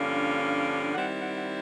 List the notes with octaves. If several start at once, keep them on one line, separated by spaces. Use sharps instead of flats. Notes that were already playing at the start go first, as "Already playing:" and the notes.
Already playing: G2 D3 F3 A#3 C#4 F5
D#3 G3 C4 E4 F#5
F#5
F#5